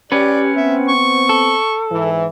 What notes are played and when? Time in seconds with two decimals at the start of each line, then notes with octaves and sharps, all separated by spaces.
0.12 C#4 G4 B4 D5
0.56 B3 C4 E5
0.88 C#6
1.29 A4
1.91 G#2 E3